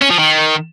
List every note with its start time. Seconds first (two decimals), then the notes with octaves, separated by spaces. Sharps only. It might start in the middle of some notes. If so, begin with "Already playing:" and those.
0.02 C#4
0.10 F3
0.19 D#3